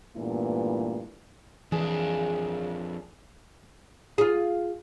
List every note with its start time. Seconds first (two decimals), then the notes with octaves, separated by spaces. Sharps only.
0.16 G2 A#2 E3 A3 B3 E4
1.72 F2 E3 D4 G#4
4.18 F4 G#4